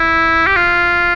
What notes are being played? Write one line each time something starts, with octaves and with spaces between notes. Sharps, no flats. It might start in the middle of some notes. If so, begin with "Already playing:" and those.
Already playing: E4
G4
F4